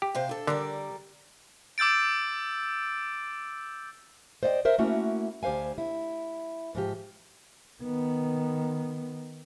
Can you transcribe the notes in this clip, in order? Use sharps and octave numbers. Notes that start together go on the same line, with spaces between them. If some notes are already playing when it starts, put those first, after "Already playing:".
G4
C3 C5 F5
D4 A4
D3 G3 A#4 D5
D6 E6 G6 A6 D7
C5 D5 D#5 F5 G5
A#4 C5 E5
A3 A#3 C#4 E4 F#4 F#5
D2 G4 C5 F5 G#5
E4
G#2 F3 G4
D#3 B3